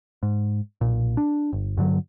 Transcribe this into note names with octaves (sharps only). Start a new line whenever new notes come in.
G#2
B1 A#2
D4
G1
G2 D3 D#3 F#3